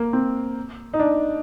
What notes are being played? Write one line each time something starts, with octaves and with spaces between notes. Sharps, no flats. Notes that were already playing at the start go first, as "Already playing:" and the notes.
Already playing: A#3
C4
D#4
D4